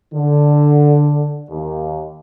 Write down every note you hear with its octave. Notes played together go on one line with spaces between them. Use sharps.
D3
D#2